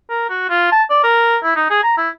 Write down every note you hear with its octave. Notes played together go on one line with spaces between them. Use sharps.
A#4
F#4
F4
A5
D5
A#4
E4
D#4
G#4
A#5
E4